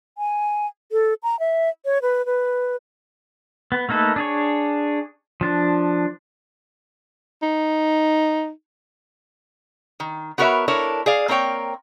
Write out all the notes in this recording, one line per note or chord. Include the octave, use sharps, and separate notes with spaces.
G#5
A4
A#5
E5
C#5
B4
B4
B3
A3 A#3 D#4 A4 B4
D4 G#4 C#5
F3 D4
D#4
D#3
B3 F#4 A#4 B4 C#5 E5
D4 E4 A4 A#4 C#5
G#4 D5 F5
A#3 C4 A#4 C#5 G5